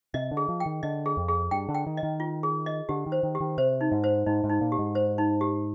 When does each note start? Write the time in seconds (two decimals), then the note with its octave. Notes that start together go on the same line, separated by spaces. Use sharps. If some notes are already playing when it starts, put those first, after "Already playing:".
0.14 C3 D#5
0.31 D3
0.37 G#4
0.49 F3
0.60 G5
0.66 D#3
0.83 D3 D#5
1.06 G#4
1.17 F2
1.29 G#4
1.51 G2 G5
1.69 D3
1.74 G5
1.86 D#3
1.97 D#5
2.03 D#3
2.20 F4
2.43 G#4
2.66 D#5
2.89 D3 G4
3.06 D#3
3.12 C5
3.23 D#3
3.35 G4
3.40 D#3
3.58 C3 C5
3.81 D#4
3.92 G#2
4.04 C5
4.26 G#2 D#4
4.44 G#2
4.50 D#4
4.61 A#2
4.72 G4
4.79 G#2
4.95 C5
5.18 D#4
5.41 G4